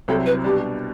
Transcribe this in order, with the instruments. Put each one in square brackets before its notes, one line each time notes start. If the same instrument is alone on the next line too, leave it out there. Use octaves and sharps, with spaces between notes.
[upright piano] C2 C3 F#3 C4 E4 [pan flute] A4
[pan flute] B4
[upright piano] B2 G3 D4 [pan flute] G4